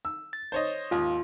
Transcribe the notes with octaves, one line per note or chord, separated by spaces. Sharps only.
E6
A6
C5 C#5 D#5
G#1 D#2 F4 D#6